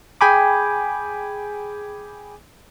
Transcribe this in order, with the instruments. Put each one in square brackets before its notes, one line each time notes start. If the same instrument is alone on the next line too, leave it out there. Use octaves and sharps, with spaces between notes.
[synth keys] G#4 G5 G#5 B5 D6